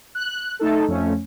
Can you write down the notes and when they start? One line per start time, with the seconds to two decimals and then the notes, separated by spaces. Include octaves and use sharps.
0.15 F#6
0.59 A3 D#4 A4
0.88 F2 F3 A3 C#4